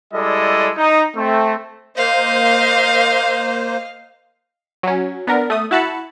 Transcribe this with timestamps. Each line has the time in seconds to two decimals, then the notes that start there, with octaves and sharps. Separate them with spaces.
0.14 G3 G#3 E4 A4 D5 D#5
0.76 D#4
1.16 A3 C4
1.97 A#3 C5 D#5 F5
4.83 F#3 C#4
5.27 B3 D4 A#4
5.50 A3 D#6
5.71 E4 F#4 A5 B5 C#7